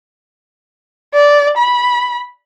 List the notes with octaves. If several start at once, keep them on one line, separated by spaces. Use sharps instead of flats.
D5
B5